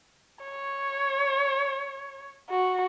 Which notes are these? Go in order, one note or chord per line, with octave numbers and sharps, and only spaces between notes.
C#5
F#4